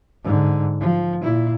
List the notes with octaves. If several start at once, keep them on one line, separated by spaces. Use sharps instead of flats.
G#2 D3
F3
A#2 E4